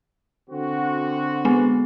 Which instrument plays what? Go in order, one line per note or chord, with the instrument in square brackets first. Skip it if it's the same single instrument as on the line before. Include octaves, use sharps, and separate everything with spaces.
[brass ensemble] D3 C4 F#4
[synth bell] G#3 B3